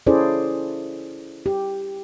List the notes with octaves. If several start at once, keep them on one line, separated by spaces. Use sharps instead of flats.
C#4 E4 G#4 A4 C5 D5
G4